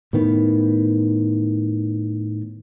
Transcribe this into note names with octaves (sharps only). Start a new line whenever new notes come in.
A2 D#3 B3